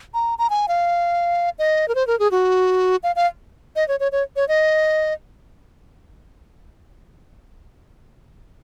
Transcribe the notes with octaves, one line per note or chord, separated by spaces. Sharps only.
A#5
A#5
G#5
F5
D#5
A#4
C5
A#4
G#4
F#4
F5
F5
D#5
C#5
C#5
C#5
C#5
D#5